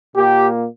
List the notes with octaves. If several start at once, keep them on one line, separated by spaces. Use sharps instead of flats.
A#2 A#3 G4